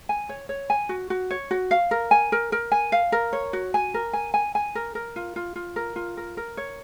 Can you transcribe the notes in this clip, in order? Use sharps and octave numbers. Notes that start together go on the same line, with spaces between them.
G#5
C#5
C#5
G#5
F#4
F#4
C#5
F#4
F5
A#4
G#5
A#4
A#4
G#5
F5
A#4
C#5
F#4
G#5
A#4
G#5
G#5
G#5
A#4
A#4
F4
F4
F4
A#4
F4
A#4
A#4
C#5